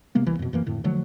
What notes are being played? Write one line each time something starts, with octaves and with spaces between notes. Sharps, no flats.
C3 G#3 A#3 B3
D1 C2 E3
F2 B2
F#2 E3 A#3
F2 A2 D3
D3 F3 F#3 A3